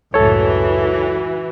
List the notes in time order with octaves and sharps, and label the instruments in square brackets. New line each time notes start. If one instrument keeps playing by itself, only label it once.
[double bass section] C#2 F#2 A2 [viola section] E3 F#4 [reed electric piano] A4 C#5